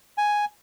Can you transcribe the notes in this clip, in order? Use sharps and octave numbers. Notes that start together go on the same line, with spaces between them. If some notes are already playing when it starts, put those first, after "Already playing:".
G#5